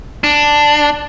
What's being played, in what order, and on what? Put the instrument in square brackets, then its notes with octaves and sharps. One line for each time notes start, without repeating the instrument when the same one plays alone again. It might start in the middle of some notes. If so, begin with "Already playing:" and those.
[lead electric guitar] D4